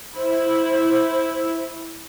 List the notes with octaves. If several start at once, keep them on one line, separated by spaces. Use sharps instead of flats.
E4 C5